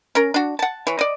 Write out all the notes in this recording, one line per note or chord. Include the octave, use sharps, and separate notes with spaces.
C#4 A#4
D4 F#4
F#5 A5
E3 C#5
D5 D#5